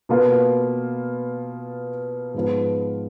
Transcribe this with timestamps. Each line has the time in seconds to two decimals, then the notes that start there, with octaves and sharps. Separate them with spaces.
0.09 B2 A#3 F4 B4
2.34 G#2 F3 B3 F4 B4